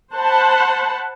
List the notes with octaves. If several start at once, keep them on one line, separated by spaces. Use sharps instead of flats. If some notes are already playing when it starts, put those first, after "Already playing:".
C5 F#5 A5 B5